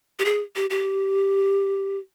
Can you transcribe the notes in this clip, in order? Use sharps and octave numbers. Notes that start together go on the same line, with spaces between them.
G4
G#4
G4
G4